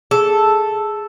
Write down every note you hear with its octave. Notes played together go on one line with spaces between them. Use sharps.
G#4 A4